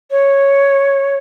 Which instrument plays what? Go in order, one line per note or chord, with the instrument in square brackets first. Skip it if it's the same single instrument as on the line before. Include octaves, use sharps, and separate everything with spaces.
[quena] C#5